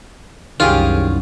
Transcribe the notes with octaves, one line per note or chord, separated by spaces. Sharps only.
C2 F#2 D#3 F4 G4 G#4 C#5